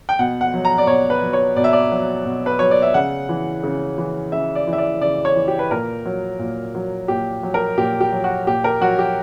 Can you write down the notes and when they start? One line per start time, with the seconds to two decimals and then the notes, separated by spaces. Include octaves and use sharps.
0.09 G5
0.19 B2 F#5
0.41 F#5
0.54 F#3
0.65 A#5
0.78 D5
0.87 B2 C#5
1.10 B4
1.22 F#3
1.33 C#5
1.56 B2 D5
1.64 E5
1.73 D5
1.92 F#3
2.25 B2
2.46 B4
2.59 F#3 C#5
2.71 D5
2.82 E5
2.94 C#3 F#5
3.29 E3
3.63 C#3
3.98 E3
4.32 C#3 E5
4.55 D5
4.67 E3
4.73 E5
4.78 D5
5.01 C#3 D5
5.25 C#5
5.36 E3
5.48 G4
5.59 B4
5.71 A#2 A#4
6.05 F#3
6.39 A#2
6.75 F#3
7.08 A#2 G4
7.43 F#3
7.54 A#4
7.77 A#2 G4
8.01 G4
8.13 F#3
8.24 F#4
8.47 A#2 G4
8.64 A#4
8.81 F#3 F#4
8.99 G4